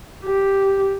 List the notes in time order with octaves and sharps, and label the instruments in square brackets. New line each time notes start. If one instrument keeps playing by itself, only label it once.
[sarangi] G4